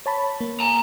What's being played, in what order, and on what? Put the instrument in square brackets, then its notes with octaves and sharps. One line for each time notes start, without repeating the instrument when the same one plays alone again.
[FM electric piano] C#5 A5 B5
A#3
[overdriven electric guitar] G#5 A#5